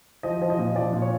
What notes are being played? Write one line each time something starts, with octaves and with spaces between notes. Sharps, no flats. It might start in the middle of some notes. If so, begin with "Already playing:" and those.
F3 D#5
F3
D#5
A#2
F3 D5
A#2
C#5